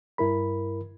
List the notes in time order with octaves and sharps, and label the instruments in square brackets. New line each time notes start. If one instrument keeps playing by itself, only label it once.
[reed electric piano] G2 E4 A#4 B5